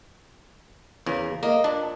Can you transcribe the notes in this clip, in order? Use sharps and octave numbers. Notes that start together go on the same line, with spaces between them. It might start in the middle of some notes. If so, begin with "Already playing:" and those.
E2 C#3 A#4
A#3 D#5
A#2 D4